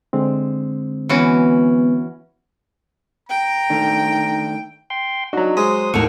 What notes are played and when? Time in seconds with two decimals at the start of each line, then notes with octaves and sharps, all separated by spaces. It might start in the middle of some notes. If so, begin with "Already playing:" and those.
0.13 D3 G#3 C4
1.09 E3 B3 C#4 F#4
3.29 G5 A#5
3.70 D#3 A3 D4
4.90 G5 C6
5.33 F#3 D4 D#4 F#4
5.57 G#3 C5 D#6
5.94 D#2 A2 A#4 F#5 C#6 E6